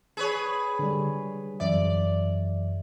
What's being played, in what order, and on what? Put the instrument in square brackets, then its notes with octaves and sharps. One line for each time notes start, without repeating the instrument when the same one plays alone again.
[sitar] G#4 B4 C#5
[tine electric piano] D3 G3
[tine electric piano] F#2 E3 E5 [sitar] D5